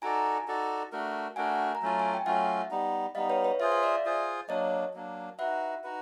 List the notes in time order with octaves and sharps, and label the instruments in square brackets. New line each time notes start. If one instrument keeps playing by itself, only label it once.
[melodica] D#4 F#4 A4 D5 [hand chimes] G#5 A#5
[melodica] D#4 F#4 A4 D5
A3 D4 F#4 A#4
[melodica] A3 D4 F#4 A#4 [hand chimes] F#5 G#5
[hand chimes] A#5
[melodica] F#3 A3 C#4 F4 [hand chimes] A5
[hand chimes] G#5
G5
[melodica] F#3 A3 C#4 F4 [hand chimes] E5 F#5
[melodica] G3 B3 D#4
[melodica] G3 B3 D#4 [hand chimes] D#5 F5
[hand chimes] B4 C#5
B4 C#5
[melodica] F4 G#4 C5 [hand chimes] E5
[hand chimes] F5
D5 E5
[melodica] F4 G#4 C5
[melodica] F#3 A#3 D4 [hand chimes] C#5 D#5
[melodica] F#3 A#3 D4
[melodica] D#4 F#4 B4 [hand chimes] E5 F#5
[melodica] D#4 F#4 B4